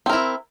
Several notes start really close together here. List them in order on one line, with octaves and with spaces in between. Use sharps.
C4 A#4 E4